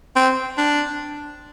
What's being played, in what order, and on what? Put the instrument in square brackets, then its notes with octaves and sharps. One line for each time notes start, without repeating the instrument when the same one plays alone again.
[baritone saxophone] C4
D4